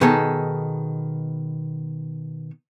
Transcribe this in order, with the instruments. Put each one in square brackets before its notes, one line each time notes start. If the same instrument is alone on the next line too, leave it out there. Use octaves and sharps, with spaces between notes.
[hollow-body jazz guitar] B2 D#3 B3 G#4 A4